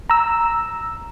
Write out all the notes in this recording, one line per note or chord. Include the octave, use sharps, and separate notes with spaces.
A#5 E6